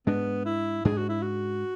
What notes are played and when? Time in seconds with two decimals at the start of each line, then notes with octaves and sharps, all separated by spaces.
0.07 G#2 G#3 B3 D4
0.46 E4
0.85 G#2 G#3 D4 G#4
0.97 F#4
1.09 E4
1.22 F#4